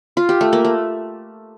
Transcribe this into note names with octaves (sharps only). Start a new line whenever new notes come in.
F4
G4
A3
A#3
A3